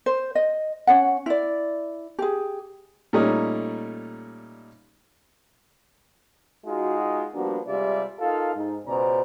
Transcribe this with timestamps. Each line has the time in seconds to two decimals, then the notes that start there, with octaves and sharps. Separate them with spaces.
0.06 C5
0.35 D#5
0.87 C#4 C#5 F#5
1.26 E4 D5
2.19 G4 G#4
3.13 A#2 G3 A3 C#4 D#4
6.66 G#3 D#4 F4 F#4
7.35 F3 G3 A#3 B3 D4 F#4
7.67 C3 G3 G#3 F4 D5 E5
8.20 D#4 F4 A4 A#4 F5
8.55 G#2 D#4
8.86 C#2 B2 C#4 C5 D5 A#5